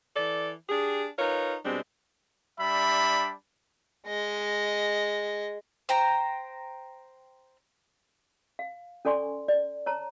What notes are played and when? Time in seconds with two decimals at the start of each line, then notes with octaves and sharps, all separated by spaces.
0.16 E3 A4 D5
0.69 D4 G4 G#4
1.18 D#4 F4 A#4 B4 C#5
1.66 B2 G3 G#3 C4 D4
2.60 G3 D4 E5 B5
4.07 G#3 D#5
5.89 C5 G5 A#5
8.59 F5
9.05 C#4 A4 D5 G#5 C6 C#6
9.48 D5
9.86 C#5 A5 A#5